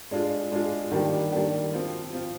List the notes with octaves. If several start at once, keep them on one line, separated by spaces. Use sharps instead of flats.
G#3 D4 F4 G#4
G#3 D4 F4 G#4
D#3 G3 A#3 D4 G4
D#3 G3 A#3 D4 G4
F3 C4 F4
F3 C4 F4